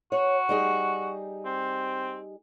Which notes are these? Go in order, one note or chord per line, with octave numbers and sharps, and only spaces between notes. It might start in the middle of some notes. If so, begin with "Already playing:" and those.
F#4 C#5
G3 D#4 G#4
C4